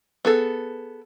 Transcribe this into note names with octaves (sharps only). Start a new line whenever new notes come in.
B3 G#4 A4